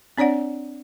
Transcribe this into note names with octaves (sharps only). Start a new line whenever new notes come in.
C4 D4 C#5 D5 F#5